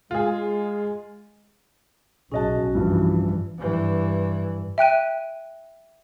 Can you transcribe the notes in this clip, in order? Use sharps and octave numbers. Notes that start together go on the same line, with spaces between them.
G#3 F4 G#4
B1 C#4 F#4 G#4 D#5 A5
G2 E3 F3
G2 E3
E5 G5 F#6 D#7